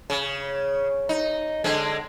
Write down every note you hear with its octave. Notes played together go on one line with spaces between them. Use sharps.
C#3
D#4
D3 G#3 C4